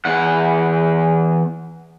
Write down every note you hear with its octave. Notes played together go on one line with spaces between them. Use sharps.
E2 F#5